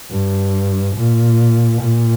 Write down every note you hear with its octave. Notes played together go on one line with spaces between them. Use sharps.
G2
A#2
A#2